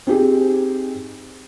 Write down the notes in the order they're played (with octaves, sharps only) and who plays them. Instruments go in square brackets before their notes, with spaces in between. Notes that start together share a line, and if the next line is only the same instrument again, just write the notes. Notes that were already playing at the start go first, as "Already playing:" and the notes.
[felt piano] C4 D#4 G4 G#4